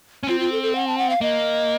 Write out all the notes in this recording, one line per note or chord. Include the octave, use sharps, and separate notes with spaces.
C#4
C4 F4
F4
A4
A4
F#5
A5
F#5
F5
A#3 D#5